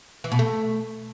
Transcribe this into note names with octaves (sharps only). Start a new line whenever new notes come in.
E3
B2
A3